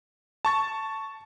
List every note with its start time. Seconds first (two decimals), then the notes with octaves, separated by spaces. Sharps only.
0.45 A5 C#6 A6